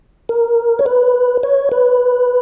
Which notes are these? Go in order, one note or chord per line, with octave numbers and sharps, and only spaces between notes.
A#4
C#5
B4
C#5
B4